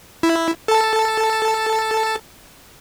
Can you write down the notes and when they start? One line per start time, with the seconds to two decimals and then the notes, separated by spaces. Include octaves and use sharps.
0.23 E4
0.68 A4 A5